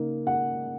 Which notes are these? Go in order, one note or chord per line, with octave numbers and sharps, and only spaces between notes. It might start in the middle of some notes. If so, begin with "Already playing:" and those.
Already playing: C#3 A#3 D#4
F#5